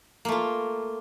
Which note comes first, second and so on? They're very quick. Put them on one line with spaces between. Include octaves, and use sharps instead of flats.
A#3 A3 F4